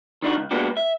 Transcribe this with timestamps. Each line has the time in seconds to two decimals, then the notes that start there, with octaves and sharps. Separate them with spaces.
0.22 D#3 D4 D#4 F#4
0.36 C#2
0.51 G#3 A#3 B3 D4 F#4 G4
0.77 E5